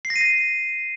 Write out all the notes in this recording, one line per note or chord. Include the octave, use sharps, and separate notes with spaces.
C7
A#6
D#7
A#6